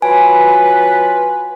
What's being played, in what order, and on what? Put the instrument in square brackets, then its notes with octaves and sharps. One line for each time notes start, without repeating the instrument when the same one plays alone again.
[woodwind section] F#3 F4 B4 [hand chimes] G#5